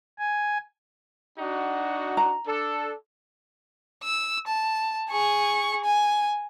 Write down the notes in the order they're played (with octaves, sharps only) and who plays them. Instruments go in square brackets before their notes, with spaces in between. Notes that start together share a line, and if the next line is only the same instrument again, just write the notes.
[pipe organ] G#5
[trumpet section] D4 D#4 F#4
[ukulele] A#5
[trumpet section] D4 A4
[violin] E6
A5
G#4 C#6
G#5